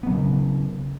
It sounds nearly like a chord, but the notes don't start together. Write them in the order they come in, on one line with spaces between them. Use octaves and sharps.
B3 F#3 C#3